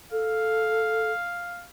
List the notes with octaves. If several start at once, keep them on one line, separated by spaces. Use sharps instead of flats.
A4 F5